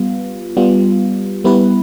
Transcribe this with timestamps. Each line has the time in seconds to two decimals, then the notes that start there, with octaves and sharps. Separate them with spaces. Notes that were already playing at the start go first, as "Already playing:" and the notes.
Already playing: G3 B3 F4
0.57 G3 B3 F4
1.44 G3 B3 E4 B4